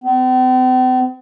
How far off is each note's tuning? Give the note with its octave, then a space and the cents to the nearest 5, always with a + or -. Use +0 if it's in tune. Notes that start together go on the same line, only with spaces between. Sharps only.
C4 -45